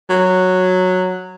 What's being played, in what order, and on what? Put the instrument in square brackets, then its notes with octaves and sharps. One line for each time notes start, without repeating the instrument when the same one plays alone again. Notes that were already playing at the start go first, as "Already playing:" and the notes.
[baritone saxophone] F#3